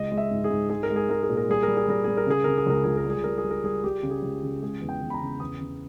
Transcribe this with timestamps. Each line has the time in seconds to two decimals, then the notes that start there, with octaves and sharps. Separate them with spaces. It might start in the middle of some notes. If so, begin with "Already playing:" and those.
Already playing: C#2 G#3 D#5
0.12 G#3
0.18 E5
0.31 G#2
0.44 G#4
0.50 G#2
0.69 G#3 G#4
0.83 A#4
0.90 G#3
0.96 G#4
1.09 G#3 A#4
1.23 G#4
1.29 A#2
1.37 A#4
1.49 G3 G#4
1.63 G3 A#4
1.77 G#4
1.88 G3 A#4
2.04 G3 G#4
2.17 A#4
2.26 C#3 G#4
2.44 C#3 A#4
2.58 G#4
2.66 C#2 A#4
2.84 C#2 G#4
2.97 A#4
3.05 G3
3.10 G#4
3.24 G3 A#4
3.38 G#4
3.44 G3
3.51 A#4
3.64 G3 G#4
3.84 G3 G4
4.03 C#3
4.10 G#4
4.22 C#2
4.43 C#3
4.63 G#3 G#4
4.82 E2
4.89 G5
5.02 E2
5.10 B5
5.14 A#5
5.21 C#3
5.40 E2 D#6
5.61 C#3